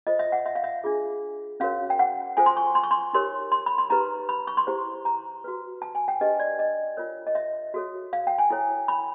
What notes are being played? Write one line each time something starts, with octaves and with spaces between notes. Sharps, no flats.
F4 A4 C5 D#5
E5
F#5
E5
F5
E5
D4 F4 G#4
C#4 F#4 A#4 C#5 F5
G5
F#5
F4 A4 C5 G#5
C6
C#6
C6
C#6
C6
D#4 G4 A#4 C#5 C6
C6
B5
C6
D#4 G4 B4 A#5
B5
C#6
C6
E4 G4 C5
A#5
F#4 B4
A5
G#5
G5
D4 G4 B4 D#5
D5
D#5
F4 A#4 C#5
D#5
E5
F#4 A4 C#5
F5
G5
G#5
E4 A4 C#5
B5